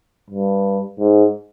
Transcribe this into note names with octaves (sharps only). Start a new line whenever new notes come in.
G2
G#2